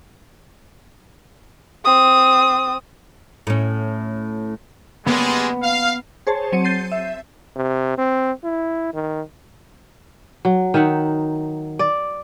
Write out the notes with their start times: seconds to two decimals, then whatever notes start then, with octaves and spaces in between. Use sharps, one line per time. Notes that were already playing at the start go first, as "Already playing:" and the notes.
1.85 C4 D#6
3.47 A2 C#4
5.06 G3 G#3 B3
5.63 F5
6.27 G#4 C5 C#5 A5
6.52 F#3 C4 C#7 D#7
6.64 G6 A6 C7 D#7
6.92 E5
7.56 C3
7.98 C4
8.44 E4
8.94 D#3
10.45 F#3
10.74 D#3 D#4 E5 F#5
11.79 D5